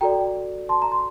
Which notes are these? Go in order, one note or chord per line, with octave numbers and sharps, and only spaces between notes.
F#4 A4 D5 G5 A#5
A5 C6
A#5
C6